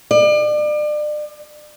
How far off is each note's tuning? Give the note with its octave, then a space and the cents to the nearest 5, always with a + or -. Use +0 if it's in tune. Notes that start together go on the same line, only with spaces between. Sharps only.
D5 +35